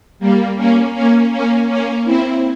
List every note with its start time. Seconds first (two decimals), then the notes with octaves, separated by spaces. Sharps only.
0.19 G3 A#3
0.56 A#3 C#4
0.94 A#3 C#4
1.31 A#3 C#4
1.68 A#3 C#4
2.04 C4 E4